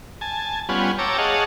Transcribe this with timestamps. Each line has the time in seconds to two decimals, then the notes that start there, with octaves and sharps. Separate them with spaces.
0.21 G#5 A5
0.69 G3 B3 C#4 F4 F#5 G#5
0.99 C#5 G5 A5 A#5 D6 E6
1.18 G#4 C#5 D#5 F5 F#5 A5